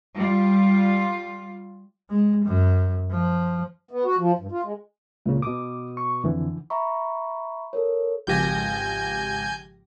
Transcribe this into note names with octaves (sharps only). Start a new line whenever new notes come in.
G3 F4
G#3
F#2
F3
B3
F#4
F3
G2
F4
G#3
C#2 A#2 C#3
B2 D6 D#6
C#6
F2 D3 E3
E5 A#5 B5 C#6
A4 A#4 C#5
G#1 C#2 F3 G4 G#5 G6 A#6